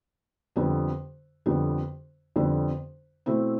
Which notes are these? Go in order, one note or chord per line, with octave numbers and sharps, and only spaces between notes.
F2 D3 G3 B3
F2 D3 G3 B3
F2 D3 G3 B3
B2 A3 C4 E4